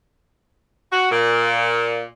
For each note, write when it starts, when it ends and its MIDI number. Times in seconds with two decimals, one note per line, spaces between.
0.93 1.07 66
1.12 2.05 46